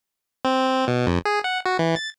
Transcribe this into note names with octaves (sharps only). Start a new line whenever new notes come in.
C4
B2
F2
G#4
F#5
F#4
E3
A6